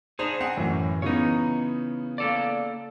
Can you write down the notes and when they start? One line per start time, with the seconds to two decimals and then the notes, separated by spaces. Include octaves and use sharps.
0.19 D4 D#4 G#4 C5
0.41 C4 F#5 G#5
0.57 F#2 A2 E3
1.02 C#3 E3 B3 D#4 C#5
2.18 A#3 A4 D5